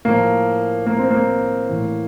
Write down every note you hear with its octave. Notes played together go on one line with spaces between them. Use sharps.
A2 F3 A#3
A#3
C4
A#3
A2 E3